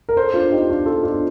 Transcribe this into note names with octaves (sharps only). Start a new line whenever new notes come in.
A#4
A4 C5
D4 F4
D#4 G4
D4 F4
F4 A4
D4 F4